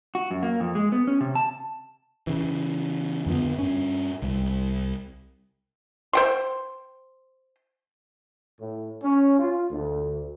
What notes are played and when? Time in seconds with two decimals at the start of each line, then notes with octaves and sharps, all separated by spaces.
0.15 F#4
0.31 F#2
0.43 A#3
0.60 F2
0.75 G#3
0.92 B3
1.07 C#4
1.21 C3
1.35 A5
2.27 C#3 E3
3.27 F2 D3 F3 B3
3.58 G2 C#4
4.22 C2
6.13 C5 G5 C6
8.60 A2
9.03 C#4
9.38 F4
9.71 D2